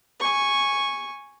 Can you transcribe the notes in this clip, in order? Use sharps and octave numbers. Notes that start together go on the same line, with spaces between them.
G#5 C#6